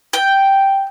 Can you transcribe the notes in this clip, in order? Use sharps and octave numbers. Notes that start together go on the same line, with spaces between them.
G5